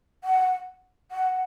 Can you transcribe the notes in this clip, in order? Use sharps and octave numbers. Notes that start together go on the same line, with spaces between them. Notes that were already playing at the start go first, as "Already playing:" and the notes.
F#5
F#5